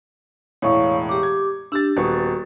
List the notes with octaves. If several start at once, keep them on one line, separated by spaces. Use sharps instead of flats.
E1 A2 C#5 F5 C#6
G4 D6
G#6
D4 G4 E6 A6
D#1 B3 F#4 C#6